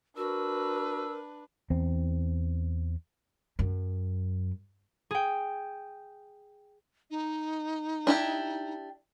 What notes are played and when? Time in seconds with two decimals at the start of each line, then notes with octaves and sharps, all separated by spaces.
0.17 D4 F#4 A#4 B4 E6
1.70 E2 C4
3.59 F#2
5.11 G#4 G5
7.10 D#4
8.07 D4 E4 G4